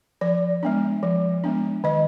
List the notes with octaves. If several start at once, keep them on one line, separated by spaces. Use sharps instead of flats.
F3 D5
G#3 B3 D4
F3
G#3 B3 D4
D#3 D#5